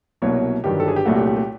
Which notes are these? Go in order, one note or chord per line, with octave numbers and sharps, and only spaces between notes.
C2 B2 F#3 A#3 C#5
G1 G2 D#3 F#3 G4
A4
G#4
G4
C2 A#2 F#3 A3 F#4
G4
G4
G4